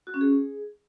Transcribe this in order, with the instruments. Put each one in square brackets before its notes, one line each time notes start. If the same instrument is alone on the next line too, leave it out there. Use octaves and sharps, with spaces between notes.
[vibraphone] F#4
C#4
G#4